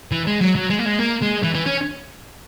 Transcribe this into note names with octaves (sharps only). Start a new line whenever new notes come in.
E3
G#3
F#3
F#3
G#3
A#3
G#3
A#3
G#3
E3
E3
C#4